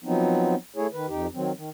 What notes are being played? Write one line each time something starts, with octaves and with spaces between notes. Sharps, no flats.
F3 F#3 B3 C4 D#4
A3 E4 G#4 C#5
D#3 B4
F2 D#4 G4
D#3 F#3 C4
D#3